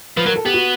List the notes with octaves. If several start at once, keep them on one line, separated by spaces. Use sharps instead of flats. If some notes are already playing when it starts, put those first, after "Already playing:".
F3 B4
F#3 A#4
A4
B3 G4
F#4